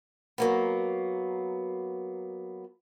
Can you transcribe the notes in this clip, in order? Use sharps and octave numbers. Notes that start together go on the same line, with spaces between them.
F#3 A#3 B3